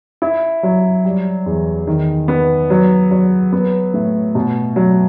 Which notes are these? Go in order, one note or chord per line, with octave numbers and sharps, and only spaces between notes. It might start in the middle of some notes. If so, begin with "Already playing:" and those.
E4
F#3
G3
E2
D#3
B3
F#3
F#3
B3
A2
B2
F#3